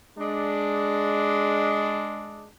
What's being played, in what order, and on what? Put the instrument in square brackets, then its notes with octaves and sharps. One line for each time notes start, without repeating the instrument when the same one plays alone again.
[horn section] G#3 D4